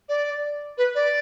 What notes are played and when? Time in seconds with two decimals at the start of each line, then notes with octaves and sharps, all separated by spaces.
0.09 D5
0.78 B4
0.95 D5